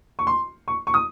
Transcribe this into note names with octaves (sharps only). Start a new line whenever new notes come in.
C#6
C6
C#6
C#6
D#6